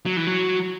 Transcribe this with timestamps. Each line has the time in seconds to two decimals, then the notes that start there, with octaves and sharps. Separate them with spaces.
0.06 F#3
0.17 E3
0.27 F#3